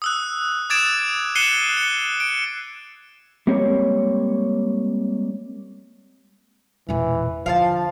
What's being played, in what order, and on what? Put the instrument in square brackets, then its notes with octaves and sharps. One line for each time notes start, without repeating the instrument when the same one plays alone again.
[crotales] D#6 E6 F#6
D6 D#6 G#6 A6 D7 E7
F#6 C7 C#7 D#7 E7 G7
C#7
D7
[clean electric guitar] G3 G#3 A#3 C4 C#5
[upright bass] E1 A#2 [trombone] E3
[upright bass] D3 [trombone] F3 [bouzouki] F5 F#5 A5